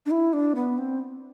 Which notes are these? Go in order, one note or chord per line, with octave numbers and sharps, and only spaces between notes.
D4
E4
D4
B3
C4